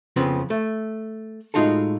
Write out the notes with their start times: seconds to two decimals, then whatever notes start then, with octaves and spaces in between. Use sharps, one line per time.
0.16 F2 C#3 F3 B3 C4
0.50 A3
1.54 A2 G#3 D#4 F4 F#4 A4